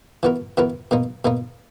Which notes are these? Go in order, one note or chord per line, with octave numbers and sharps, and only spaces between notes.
E3 B3 F#4 A#4
E3 B3 F#4 A#4
B2 A#3 D#4
B2 A#3 D#4